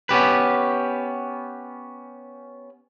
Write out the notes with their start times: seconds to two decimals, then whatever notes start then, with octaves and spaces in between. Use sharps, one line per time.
0.09 B3 C#4 G4 B4